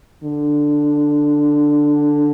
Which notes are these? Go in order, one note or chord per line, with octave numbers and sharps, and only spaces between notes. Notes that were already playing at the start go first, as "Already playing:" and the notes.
D3